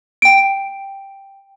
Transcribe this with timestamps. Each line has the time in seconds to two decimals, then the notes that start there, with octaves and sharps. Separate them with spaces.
0.22 G5 D7